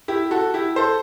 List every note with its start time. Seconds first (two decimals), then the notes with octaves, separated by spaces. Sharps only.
0.08 E4 G4
0.31 F#4 A4
0.54 E4 G4
0.76 A4 C5